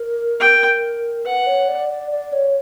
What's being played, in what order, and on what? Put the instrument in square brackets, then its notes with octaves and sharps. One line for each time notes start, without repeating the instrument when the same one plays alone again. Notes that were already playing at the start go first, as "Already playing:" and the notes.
Already playing: [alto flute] A#4
[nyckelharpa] G5
[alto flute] B4 [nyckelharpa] F#5
[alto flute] C#5
D5
D5
D5
C#5